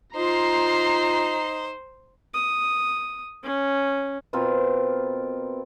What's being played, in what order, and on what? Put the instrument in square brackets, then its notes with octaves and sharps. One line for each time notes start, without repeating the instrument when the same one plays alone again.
[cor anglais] D#4 [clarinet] F4 [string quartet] C5 [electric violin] A#5 C7
[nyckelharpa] D#6
C#4
[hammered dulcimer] B2 C4 F4 A#4